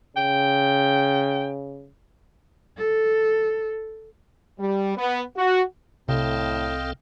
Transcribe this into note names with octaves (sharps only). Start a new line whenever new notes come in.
C#3 G5
A4
G3
B3
F#4
C2 A2 C3 C4 A4 D#5 F5 G5